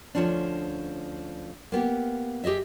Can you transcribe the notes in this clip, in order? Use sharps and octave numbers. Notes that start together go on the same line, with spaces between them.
D2 G#2 F3 C#4 D4
A#3 B3 G4
G4 G#4 D#5 E5